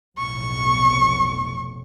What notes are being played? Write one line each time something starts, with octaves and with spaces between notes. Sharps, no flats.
F1 B1 A2 C#6